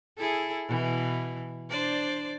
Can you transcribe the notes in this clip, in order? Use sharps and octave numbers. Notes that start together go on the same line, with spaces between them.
E4 G#4 A4
B2 E3
D4 C5 D5